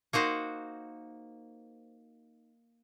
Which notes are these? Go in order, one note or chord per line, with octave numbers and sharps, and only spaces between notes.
A#3 D#4 F#4 C5